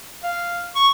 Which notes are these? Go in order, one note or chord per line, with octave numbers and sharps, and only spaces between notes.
F5
C#6